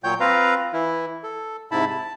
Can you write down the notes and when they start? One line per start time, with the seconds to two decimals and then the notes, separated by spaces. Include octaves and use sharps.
0.04 A#2 F#3 C#5 G5 G6
0.20 C4 F4 B4 F5 A#5
0.73 E3 E4
1.23 A4
1.71 G#2 C3 E4 A5 B5
1.90 A5